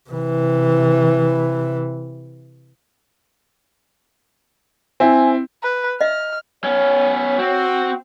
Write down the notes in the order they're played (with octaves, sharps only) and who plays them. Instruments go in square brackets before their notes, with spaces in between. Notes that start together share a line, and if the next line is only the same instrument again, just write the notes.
[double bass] C3 E3
[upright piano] C4 E4 [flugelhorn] G#5
[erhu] B4
[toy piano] D#5 E5 [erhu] F6
[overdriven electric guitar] B3 C#4 [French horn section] C#5
[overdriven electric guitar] C4 [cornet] F#4